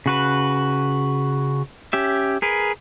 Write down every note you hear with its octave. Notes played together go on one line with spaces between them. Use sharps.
C#3 F#4 B4
C#4 G4 E5
G#4 A#4 B4